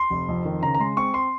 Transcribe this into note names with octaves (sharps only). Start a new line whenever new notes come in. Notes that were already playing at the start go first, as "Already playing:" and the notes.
Already playing: C6
F1
F2
D#3
C#3 A#5
A#5
G#3 C6
C4 C#6
C6